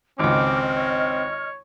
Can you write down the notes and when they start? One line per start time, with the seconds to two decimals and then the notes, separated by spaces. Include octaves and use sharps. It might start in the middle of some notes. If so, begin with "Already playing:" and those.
0.19 G#1 C#2 C4 D#5 D6 F6
0.76 C#5